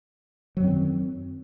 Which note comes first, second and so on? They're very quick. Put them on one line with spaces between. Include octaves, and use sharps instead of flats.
F#3 F#2 C4 D#3